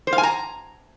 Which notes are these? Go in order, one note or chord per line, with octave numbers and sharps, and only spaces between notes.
C5
F5
G#5
A#5